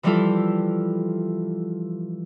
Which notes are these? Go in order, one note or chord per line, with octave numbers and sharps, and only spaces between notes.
E3 F3 G3 E4 F4 A4